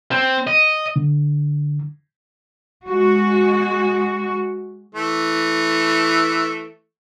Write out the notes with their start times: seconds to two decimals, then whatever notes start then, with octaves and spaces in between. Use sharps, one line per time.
0.11 C4
0.47 D#5
0.96 D3
2.86 G#3 F#4
4.94 E3 A3